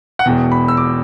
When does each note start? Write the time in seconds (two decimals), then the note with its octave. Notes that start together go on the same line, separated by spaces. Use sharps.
0.19 F#5
0.25 E1 E2 B2 G5
0.52 B5
0.68 E6
0.77 D6